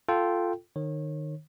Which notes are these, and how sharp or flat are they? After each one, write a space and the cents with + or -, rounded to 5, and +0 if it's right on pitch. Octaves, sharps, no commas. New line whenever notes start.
F4 +0 A4 +0 G5 -10
D#3 -30 C#5 -30